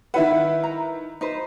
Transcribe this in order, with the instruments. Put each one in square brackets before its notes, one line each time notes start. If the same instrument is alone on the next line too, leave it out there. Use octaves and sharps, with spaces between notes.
[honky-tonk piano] D#3 E4 B4 [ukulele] E5 F#5
[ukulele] A#5
D#4 B4 C5